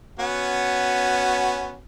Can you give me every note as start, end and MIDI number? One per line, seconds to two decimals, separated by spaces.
0.19 1.78 59
0.19 1.78 61
0.19 1.78 66